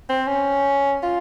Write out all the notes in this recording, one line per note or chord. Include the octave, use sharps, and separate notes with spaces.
C4
C#4
F4